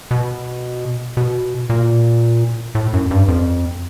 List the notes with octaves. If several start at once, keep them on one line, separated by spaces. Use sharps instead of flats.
B2
B2
A#2
A2
F#2
G2
F2